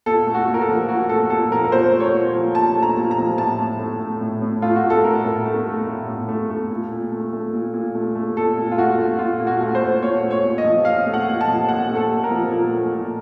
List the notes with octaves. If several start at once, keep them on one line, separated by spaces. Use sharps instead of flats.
A#2 A4
A3
F#4
A#2
A#4
A4
F3
A#2 F#4
A3 A4
A#2 A4
F3 A#4
A#4
A#2 C5
A3
C#5
A#2
F3
A#2 A5
A3
A#5
A#2
A#5
F3
A2 A5
A2
A3
A3
A2
A2
A3 F4
F#4
A3
A4
A2 A#4
A2
A3
A3
A2
A2
A3
A3
A#2
A#2
A3
A3
A#2
A#2
A3
A3
A#2 A4
A#2
F4
A3 F#4
A3
A#2 F4
A#2
F#4
A3
C5
A3
A#2 C#5
A3
C#5
A#2
D#5
F3
A#2 F5
A3
F#5
A#2
A5
F3
A#2 F#5
A3
A4
A#2
A#4
F3
A#2
A3
A#2